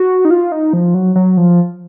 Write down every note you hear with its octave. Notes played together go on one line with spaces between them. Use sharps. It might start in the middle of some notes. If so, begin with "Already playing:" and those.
Already playing: F#4
D#4
F4
D#4
F3
F#3
F#3
F3